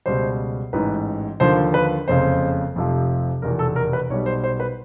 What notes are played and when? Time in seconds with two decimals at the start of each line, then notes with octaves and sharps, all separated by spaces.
0.06 C#2 B2 G3 C5
0.73 A1 G#2 E3 B4
1.40 D#2 D3 F3 C5
1.74 B4
2.08 F#1 F2 C#3 C5
2.75 F1 F2 C3 F3
3.42 F1 E2 B2 A#4
3.59 A4
3.76 A#4
3.93 B4
4.10 B1 B2 G3 C#5
4.26 C5
4.44 C5
4.60 B4